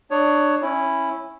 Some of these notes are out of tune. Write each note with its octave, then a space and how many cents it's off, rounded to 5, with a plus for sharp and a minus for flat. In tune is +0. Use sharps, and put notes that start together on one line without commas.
D4 +20 C#5 +10 D#6 +0
C#4 -15 E4 +0